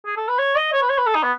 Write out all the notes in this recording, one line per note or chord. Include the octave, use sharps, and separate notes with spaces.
G#4
A4
B4
C#5
D#5
C#5
B4
C#5
B4
A4
D#4
B3